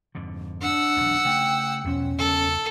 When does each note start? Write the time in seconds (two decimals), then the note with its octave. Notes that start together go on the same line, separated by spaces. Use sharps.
0.15 F2 G#2 D3
0.62 D4 F#5 E6
0.96 E1 B1 F2
1.25 C#3 A3 G5
1.85 B1 E2 F3 C#4
2.18 F#1 F#2 A4